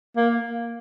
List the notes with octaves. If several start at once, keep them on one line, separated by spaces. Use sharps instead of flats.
A#3